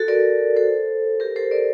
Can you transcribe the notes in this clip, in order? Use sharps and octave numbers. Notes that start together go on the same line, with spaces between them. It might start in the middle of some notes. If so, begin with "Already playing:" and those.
Already playing: F#4 A4
A#4 D5
A4 C5
G4 A#4
A4 C5
A#4 D5